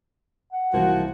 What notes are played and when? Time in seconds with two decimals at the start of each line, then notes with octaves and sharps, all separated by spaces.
0.52 F#5
0.73 C2 E3 F3 A#3 F#4